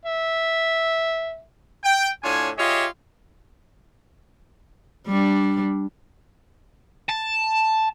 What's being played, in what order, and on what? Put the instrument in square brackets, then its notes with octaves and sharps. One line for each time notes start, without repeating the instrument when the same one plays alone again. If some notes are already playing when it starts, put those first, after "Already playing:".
[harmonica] E5
[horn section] G5
A2 D4 F4 C#5 G#5
F4 G4 G#4 C#5 D#5 E5
[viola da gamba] G3 D4
[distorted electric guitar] A5